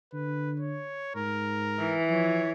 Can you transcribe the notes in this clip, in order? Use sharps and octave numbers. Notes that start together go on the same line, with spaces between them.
D3 B4
C#5
G#2 A#4
E3
F3 C#5